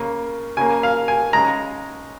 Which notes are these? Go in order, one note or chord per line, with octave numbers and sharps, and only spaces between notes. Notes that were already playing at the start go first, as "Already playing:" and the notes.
Already playing: C#3 A#3
C#3 A#3 G#5
F5
G#5
C#3 G#3 A#5